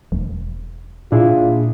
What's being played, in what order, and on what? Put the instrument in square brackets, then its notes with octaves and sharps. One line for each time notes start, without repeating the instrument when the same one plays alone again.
[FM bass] E1
[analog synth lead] A#2 [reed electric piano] D4 E4 G#4 [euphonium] F4